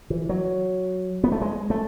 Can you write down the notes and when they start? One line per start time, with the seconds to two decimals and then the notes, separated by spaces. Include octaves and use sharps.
0.10 E3
0.29 F#3
1.24 B3
1.32 A3
1.42 G#3
1.70 A3